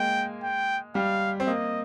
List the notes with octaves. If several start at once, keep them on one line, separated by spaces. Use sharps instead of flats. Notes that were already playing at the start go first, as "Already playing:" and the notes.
Already playing: G#3 A#3 G5
G5
G3 F5
C4
A#3 D#5